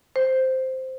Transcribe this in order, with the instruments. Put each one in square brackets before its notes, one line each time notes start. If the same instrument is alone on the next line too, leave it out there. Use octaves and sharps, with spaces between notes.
[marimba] C5